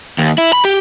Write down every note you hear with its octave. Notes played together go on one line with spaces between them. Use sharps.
D#2
E4
B5
G4